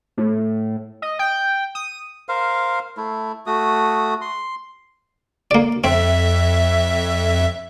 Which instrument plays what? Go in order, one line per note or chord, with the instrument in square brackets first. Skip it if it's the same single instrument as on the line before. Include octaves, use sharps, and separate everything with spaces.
[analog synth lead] A2
D#5
G5
D#6
[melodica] A#4 C5 F5
A3 E4
A3 F#4 D#6
C6
[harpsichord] A#3 D5
[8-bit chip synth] F2 E5 [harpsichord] C4